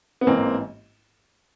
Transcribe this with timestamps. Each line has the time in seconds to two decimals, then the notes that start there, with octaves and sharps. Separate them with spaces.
0.21 B3
0.27 A1 G#2 E3 A#3 C4